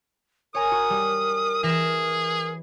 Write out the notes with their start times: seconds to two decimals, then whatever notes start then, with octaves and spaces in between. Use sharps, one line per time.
0.55 A#4 C#5 G#5 A#5 D#6
0.72 F#4
0.90 G3
1.63 E3 G#4 A#6 E7